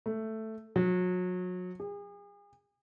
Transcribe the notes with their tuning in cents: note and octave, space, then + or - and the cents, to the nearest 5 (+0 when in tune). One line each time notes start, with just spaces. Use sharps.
A3 +5
F#3 -30
G#4 -40